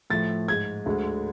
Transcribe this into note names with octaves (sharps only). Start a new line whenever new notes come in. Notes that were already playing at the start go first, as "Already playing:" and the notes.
A2 F3 A3 A6
G#2 G#3 G#6
D2 D3 G#3